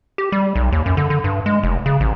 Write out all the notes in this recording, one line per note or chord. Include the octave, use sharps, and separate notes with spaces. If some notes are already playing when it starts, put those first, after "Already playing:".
G4
G3
B1
D#2
F#2
D3
D3
G2
G#3
F1
C#3
A1